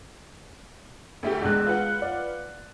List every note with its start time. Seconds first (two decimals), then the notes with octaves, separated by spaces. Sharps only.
1.23 D2 A3 G4
1.42 A#1 E2 G#3 F#6
1.66 F4 B4 F#5
2.02 D5